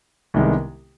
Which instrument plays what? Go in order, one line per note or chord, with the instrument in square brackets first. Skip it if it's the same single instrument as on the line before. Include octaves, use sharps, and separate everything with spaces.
[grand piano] C2 C3 D#3 G#3 B3